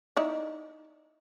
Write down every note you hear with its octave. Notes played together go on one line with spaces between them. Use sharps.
D#4 E4 D5